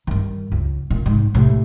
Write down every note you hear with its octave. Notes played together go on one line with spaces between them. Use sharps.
G2 D#3
C#2
A#2 D#3
G#2 C3
A2 C3